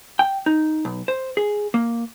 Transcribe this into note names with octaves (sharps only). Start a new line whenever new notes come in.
G5
D#4
B1
C5
G#4
A#3